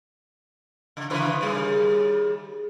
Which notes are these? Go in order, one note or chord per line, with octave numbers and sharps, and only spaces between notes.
C#3
C#3 E3 B4
D#2 G3 G#4